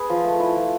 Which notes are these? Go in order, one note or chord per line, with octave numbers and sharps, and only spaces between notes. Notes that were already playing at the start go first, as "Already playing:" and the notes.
Already playing: G#4 B4
F3
A3
E4
F3